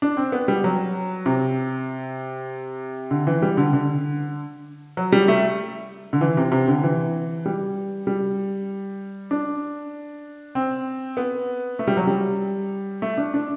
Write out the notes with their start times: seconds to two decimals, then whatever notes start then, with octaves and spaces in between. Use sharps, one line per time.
0.02 D4
0.17 C4
0.32 B3
0.48 G3
0.64 F#3
1.26 C3
3.11 D3
3.27 E3
3.42 G3
3.57 D3
3.73 D3
4.97 F#3
5.12 G3
5.28 A3
6.13 D3
6.21 E3
6.37 C3
6.52 C3
6.68 D3
6.83 E3
7.46 G3
8.07 G3
9.31 D4
10.55 C4
11.17 B3
11.79 A3
11.87 G3
11.97 F#3
12.07 G3
13.02 A3
13.17 D4
13.34 D4